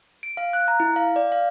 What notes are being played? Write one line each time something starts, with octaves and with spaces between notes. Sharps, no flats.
D7
F5
F#6
A#5
E4
F5
D5
F5